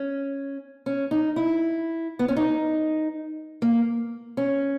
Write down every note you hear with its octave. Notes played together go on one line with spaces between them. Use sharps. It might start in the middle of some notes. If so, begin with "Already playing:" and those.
Already playing: C#4
C#4
D#4
E4
B3
C#4
D#4
A#3
C#4